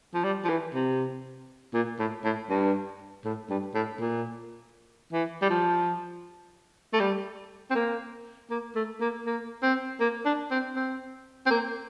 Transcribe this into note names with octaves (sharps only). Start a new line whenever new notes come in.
F3
G3
F3
E3
C3
A#2
A2
A2
G2
A2
G2
A2
A#2
E3
G3
F3
A3
G3
C4
A#3
A#3
A3
A#3
A#3
C4
A#3
D4
C4
C4
C4
A#3